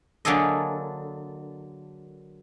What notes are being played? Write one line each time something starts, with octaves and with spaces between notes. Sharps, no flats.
D3 F#3 A#3 G#4 A4 D#5